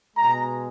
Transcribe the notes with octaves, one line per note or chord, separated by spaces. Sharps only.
B2 G#3 A#5